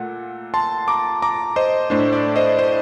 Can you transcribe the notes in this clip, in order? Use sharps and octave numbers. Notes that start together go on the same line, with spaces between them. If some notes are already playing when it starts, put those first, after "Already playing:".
Already playing: A#2 A3 F#5
A5 C6
A#5 D6
A#5 D6
C5 D#5
A2 A3 D4 C5
D5
C5 D#5
C5